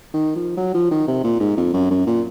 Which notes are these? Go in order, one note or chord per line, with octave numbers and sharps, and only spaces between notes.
D#3
F3
F#3
F3
D#3
C3
A#2
G#2
F2
F#2
F#2
A#2